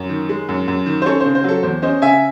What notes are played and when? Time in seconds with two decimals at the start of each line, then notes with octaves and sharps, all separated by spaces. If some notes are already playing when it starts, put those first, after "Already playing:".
Already playing: F#2
0.09 D#3
0.29 G#3
0.49 F#2
0.68 F#2
0.86 D#3
1.02 C5
1.06 C#4 A4 C#5
1.20 C#3 C5
1.35 C5
1.44 F#3 A4
1.63 E2 C5
1.82 C#4 C5 D#5
2.02 C#3 E5 G#5